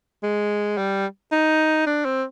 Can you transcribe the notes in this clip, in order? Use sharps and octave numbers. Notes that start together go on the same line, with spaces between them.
G#3
G3
D#4
D4
C4